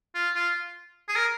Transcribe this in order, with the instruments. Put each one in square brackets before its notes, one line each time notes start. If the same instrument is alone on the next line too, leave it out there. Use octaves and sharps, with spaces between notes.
[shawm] F4
F4
G#4
A#4